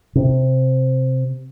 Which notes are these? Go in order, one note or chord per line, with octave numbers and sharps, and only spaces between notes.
C3